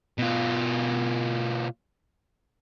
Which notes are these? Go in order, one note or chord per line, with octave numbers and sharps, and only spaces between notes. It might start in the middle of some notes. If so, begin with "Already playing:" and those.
B2 F4